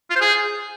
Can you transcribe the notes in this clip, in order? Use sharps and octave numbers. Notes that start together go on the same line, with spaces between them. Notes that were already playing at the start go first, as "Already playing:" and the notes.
F4
C5
G#4